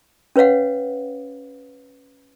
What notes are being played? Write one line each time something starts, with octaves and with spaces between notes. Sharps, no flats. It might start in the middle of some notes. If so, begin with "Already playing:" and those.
C#4 B4 C#5 F5 F#5